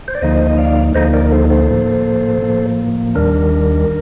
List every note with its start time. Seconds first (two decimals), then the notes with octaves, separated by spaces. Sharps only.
0.08 C5
0.15 D5
0.21 D2 D3 F3 A#3 D#4 C5 D#5
0.46 D#5
0.58 D5 F5
0.95 D2 D3 F3 A#3 D#4 C5 D#5
1.13 A#4 D5
1.25 A#4
1.32 A4 C5
1.50 A4 C5
1.69 A2 F3 A#3
2.42 A2 F3 A#3
3.15 D#2 D#3 G3 D4 A#4